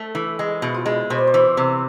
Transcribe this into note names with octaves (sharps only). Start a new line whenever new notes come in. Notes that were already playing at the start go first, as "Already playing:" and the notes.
Already playing: A3 A4
E3
G#3 G#4
B2 E4
F4
G#3 E4
B2 C5
D5
C5
E3
C3